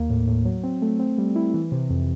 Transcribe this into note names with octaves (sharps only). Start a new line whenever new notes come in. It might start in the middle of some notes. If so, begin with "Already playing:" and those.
Already playing: D#2 A#3
A2
A2
F#3
C4
A3
C4
G3
E4
E3
C3
F2